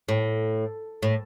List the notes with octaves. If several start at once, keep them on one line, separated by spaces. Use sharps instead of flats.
A2
A2